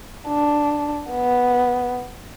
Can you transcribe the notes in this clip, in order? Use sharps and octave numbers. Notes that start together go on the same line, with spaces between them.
D4
B3